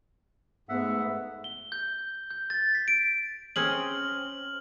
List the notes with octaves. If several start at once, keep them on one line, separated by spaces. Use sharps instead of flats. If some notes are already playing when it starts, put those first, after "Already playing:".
G#2 A3 B3 E5 F#5
G7
G6
G6
A6
B6
D7
C4 C#4 G#4 F6 F#7